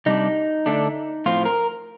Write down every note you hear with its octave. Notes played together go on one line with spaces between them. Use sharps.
C3 G3 D4 D#4
D3 A3 D4
A2 F3 C4 F4
A#4